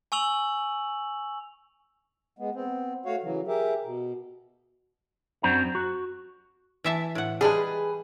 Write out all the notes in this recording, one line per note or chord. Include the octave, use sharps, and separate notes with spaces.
G#5 C#6 E6 F7 F#7
G#3 B3
B3 C4
A3 F#4 C#5 F5
C#3 E3 F#3
G4 G#4 A#4 E5
B2
F#2 C4 D4 F#4 A#5
F#4
E3 E5 A5
A2 F#5
G3 G#3 G#4 B4